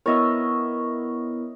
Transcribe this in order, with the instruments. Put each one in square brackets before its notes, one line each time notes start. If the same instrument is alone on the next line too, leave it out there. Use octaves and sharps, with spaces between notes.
[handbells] B3 E4 A#4 [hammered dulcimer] C#5 D#5 E5